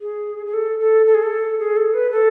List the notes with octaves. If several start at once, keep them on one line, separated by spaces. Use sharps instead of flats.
G#4
G#4
A4
A4
A4
G#4
A4
G#4
A4
B4
A4